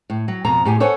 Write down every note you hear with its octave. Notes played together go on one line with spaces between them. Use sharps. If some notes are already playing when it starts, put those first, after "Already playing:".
A2
F#3
F2 B2 A#5
A2 G4 G#5
A4 C5 C#5 F#5 G#5